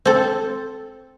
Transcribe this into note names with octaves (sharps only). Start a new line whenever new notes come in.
C4 A4